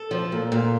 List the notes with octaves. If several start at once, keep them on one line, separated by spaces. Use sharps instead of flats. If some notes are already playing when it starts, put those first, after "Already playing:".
Already playing: A4
F3
A#2
A#2